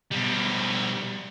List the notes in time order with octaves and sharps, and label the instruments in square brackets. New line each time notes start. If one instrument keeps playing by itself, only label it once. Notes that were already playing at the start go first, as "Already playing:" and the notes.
[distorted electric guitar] B2 G3